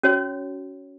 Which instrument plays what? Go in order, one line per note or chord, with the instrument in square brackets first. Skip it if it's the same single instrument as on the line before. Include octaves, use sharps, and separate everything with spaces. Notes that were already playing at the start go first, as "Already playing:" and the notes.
[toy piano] C#4 F#4 C#5